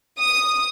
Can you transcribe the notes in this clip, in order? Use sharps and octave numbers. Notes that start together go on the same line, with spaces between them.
D#6